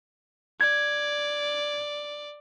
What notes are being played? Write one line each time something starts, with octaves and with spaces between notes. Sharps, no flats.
D5 G#6